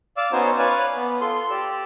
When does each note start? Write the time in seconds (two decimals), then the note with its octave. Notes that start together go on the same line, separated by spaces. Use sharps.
0.17 D5 F5 D6 E6
0.32 B3 C#4 D#4 F#4 C5 C#5
0.58 B4 C#5 D5 F5 G#5
0.97 B3
1.21 F4 A4 C6
1.50 G4 D5 E6